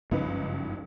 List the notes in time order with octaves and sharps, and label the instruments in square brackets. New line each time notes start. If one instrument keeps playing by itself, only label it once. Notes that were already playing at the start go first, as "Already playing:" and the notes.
[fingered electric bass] F#1 G2 F3 [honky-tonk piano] C#2 D#4 B4